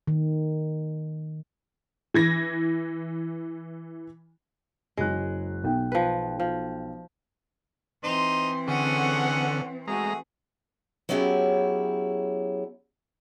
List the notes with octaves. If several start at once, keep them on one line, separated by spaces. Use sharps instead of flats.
D#3
E3 G#6 A#6
F#1 F#3 G#3 F#6
B1 G5
F3 B4
F3
E3 C4 D#4 C5 C6
D3 C#4 G#4 A4 C#5 F#5
G#3 A3 F#4 G#4 A#5
F#3 B3 C#4 E4 G4 G#4